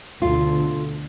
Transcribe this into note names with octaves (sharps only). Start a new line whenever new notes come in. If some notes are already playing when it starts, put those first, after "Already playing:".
D2 B2 D3 F4